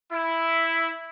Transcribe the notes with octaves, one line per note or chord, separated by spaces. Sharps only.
E4